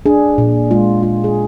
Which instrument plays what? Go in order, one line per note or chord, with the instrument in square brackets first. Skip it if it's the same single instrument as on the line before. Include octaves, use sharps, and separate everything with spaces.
[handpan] D4 G#4
A#2
G#3 F4
F4
G#4